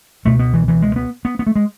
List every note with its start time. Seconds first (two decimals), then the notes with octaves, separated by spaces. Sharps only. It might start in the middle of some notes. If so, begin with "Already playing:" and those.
0.25 C#2 B2 A3
0.39 B3
0.54 E3
0.68 E3
0.82 G#3
0.96 B3
1.25 B3
1.39 B3
1.47 A3
1.56 G#3